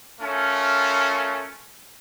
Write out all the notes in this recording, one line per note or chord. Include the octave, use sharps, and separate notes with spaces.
A3 C#4 F4 A#4